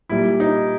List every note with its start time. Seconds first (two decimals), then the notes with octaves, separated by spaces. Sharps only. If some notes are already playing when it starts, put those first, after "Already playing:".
0.09 A#2 G3 E4
0.40 D#4